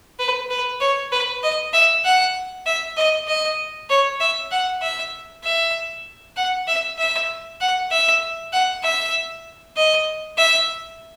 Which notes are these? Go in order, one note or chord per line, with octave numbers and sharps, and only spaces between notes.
B4
B4
C#5
B4
D#5
E5
F#5
E5
D#5
D#5
C#5
E5
F#5
E5
E5
F#5
E5
E5
F#5
E5
F#5
E5
D#5
E5